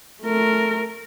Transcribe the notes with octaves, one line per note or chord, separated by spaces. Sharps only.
A3 A#4